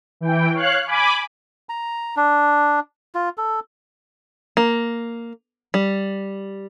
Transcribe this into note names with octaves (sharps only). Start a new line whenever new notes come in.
E3 G5
C#5 F5 F#6
G#5 B5 D6
A#5
D4
F4
A4
A#3
G3